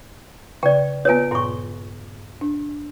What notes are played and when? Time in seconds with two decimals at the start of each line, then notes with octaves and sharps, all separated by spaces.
0.63 C#3 D5 G5
1.05 B3 F4 B4 C#5 G#5
1.31 G2 A#2 C6 C#6
2.41 D4